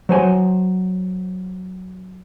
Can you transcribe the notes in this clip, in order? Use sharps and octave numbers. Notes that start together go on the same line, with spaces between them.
F#3 C5 G#5